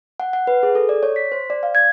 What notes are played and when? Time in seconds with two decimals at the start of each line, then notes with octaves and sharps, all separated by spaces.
0.20 F#5
0.33 F#5
0.47 B4
0.63 G#4
0.75 A4
0.89 D5
1.03 C#5
1.16 B6
1.32 C5
1.50 D5
1.63 F5
1.75 G#6